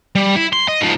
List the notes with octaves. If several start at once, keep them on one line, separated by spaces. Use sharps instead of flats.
G3
E4
C6
D#5
G#2 F3